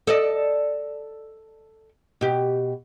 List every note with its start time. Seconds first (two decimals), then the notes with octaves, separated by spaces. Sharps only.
0.07 A4 D5 D#5
2.21 B2 G4